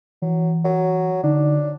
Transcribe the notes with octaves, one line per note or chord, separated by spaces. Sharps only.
E3 F#3
F#3
D3 D4 D#4